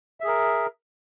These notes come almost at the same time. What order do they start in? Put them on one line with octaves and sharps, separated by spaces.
E5 G#4 A#4